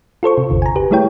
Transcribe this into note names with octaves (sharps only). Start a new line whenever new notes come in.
F4 A4 C5 C#6
C3
G#1 E2 D3
G#5 A#5
G4 B4
G3 A3 E4 G#4 C#5 G5